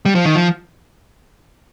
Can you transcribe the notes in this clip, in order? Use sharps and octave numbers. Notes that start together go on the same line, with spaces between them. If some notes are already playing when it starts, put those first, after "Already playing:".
G3
F3
D#3
F3